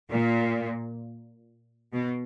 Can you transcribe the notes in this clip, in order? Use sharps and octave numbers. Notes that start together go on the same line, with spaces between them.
A#2
B2